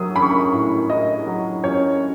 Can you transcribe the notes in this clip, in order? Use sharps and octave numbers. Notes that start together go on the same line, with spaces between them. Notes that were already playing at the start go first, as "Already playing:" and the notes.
Already playing: F#3 D#6 E6
C#4 B5
C#6
B5
A2
E4 D#5
F#3
C#4 C#5